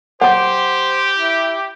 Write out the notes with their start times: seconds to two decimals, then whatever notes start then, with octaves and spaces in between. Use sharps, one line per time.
0.21 G4 C5 F#5 D6
1.18 E4